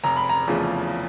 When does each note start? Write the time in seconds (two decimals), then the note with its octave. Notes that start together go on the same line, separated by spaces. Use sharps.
0.04 F1 A#5
0.17 B5
0.29 A#5
0.48 E2 C#3 F3 A3